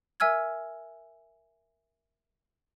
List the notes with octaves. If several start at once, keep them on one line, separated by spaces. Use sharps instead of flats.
A#4 E5 G#5 E6 F6 G#6